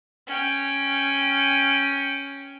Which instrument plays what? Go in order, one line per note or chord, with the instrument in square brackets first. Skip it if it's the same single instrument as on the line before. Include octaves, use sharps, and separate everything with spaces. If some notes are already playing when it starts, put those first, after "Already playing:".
[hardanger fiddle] C#4 G5